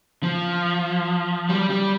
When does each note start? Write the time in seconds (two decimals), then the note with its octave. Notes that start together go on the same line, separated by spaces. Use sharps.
0.23 F3
1.49 G3
1.70 G3